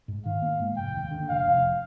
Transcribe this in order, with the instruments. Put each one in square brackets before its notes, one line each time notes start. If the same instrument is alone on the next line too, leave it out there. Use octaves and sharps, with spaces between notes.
[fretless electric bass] G#2
[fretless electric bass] D#3 [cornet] F5
[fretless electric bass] A#3
G#2
[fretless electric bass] F1 [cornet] G5
[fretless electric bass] D#2
D3
[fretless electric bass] F1 [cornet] F5
[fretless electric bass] F1